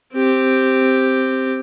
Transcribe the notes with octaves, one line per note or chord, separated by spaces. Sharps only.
C4 G4